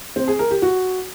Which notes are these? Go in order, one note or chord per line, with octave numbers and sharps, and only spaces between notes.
C4
G#4
A#4
G4
F#4